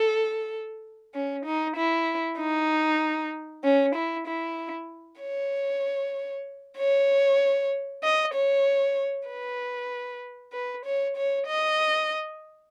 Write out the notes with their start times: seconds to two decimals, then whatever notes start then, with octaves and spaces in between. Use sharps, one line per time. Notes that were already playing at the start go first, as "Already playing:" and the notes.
Already playing: A4
1.14 C#4
1.45 D#4
1.76 E4
2.38 D#4
3.64 C#4
3.95 E4
4.27 E4
5.21 C#5
6.78 C#5
8.03 D#5
8.34 C#5
9.28 B4
10.53 B4
10.85 C#5
11.17 C#5
11.47 D#5